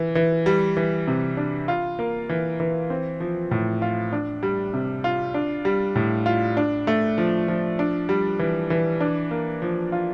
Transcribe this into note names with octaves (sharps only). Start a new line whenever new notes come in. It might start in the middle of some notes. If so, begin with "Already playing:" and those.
Already playing: E3
E3
G3
E3
C3
D4
F4
A#3
E3
E3
C4
F3
A2
F4
D4
G3
C3
F4
D4
G3
A2
F4
D4
A3
F3
F3
D4
G3
E3
E3
D4
A#3
F3
F4